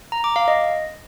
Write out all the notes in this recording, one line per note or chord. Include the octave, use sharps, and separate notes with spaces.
A#5
D6
F5
D#5